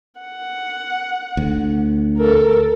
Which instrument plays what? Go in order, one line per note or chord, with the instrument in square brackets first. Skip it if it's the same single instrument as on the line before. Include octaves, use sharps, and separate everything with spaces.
[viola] F#5
[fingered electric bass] D2
[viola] A4 A#4